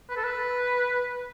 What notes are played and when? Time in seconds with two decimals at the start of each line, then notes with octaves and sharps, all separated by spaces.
0.10 B4
0.17 A4
0.24 B4